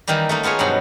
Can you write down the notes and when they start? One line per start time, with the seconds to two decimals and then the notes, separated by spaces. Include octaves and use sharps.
0.07 D#3 E3 G3 A#3
0.29 A3 A#3 D#4
0.43 A#3 B3 F4 G#4 C#5
0.59 G2 B2 F3 F#3 D#4